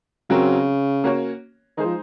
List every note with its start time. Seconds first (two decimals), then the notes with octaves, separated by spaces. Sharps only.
0.30 C#3 F#3 C4 F#4 A#4
1.04 A#3 C#4 F#4 C#5
1.77 D#3 G#3 D#4 G#4 C5
1.85 F3